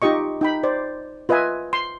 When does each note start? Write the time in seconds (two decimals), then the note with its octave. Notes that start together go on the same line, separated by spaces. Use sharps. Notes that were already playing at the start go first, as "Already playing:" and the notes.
0.02 D#4 F4 G4 D#5 C#6
0.41 D#4 G5 B5
0.63 C5 D5
1.29 F4 B4 D#5 E5 G#5
1.73 C6